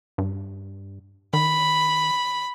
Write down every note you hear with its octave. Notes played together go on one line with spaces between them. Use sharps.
G2
D#3 B5